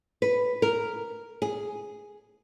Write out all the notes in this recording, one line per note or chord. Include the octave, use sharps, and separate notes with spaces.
B4
A#4
G#4